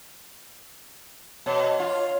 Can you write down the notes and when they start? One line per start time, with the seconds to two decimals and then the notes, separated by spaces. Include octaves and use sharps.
1.46 B2 C#5
1.80 F4